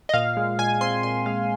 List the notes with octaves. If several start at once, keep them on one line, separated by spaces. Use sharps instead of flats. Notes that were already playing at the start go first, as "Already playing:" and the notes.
D#5
A#2 F5
G#3
A#2 G#5
C4 C6
A#2 C6
G#3 F5